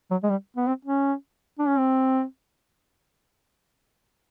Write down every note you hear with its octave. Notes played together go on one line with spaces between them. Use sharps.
F#3
G#3
G3
B3
C4
C#4
D4
C#4
C4